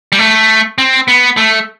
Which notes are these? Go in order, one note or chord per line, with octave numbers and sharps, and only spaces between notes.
G3
A3
C4
B3
A3